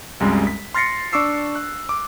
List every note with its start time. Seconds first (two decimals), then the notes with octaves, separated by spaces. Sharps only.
0.20 C2 F#2 G3 G#3
0.47 B6
0.74 C6 F6 A6 A#6 C7 C#7
1.13 D4 C#6 D6 E6 C7
1.55 F#6
1.89 D6